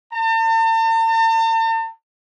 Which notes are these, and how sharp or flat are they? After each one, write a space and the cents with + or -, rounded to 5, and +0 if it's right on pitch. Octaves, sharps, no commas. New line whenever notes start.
A5 +45